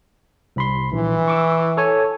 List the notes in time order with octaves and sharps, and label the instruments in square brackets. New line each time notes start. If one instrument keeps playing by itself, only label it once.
[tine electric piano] C2 B5 C6
[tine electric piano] A#1 [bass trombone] E3
[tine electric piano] C#6 D6 E6
A4 C#5 G#5